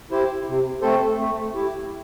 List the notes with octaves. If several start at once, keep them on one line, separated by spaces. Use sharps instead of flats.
E4 G4 C5
C3
A3 C4 A4 C5
A3
E4 G4